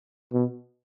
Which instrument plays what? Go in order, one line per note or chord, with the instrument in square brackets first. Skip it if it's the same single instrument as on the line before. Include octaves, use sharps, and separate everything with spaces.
[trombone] B2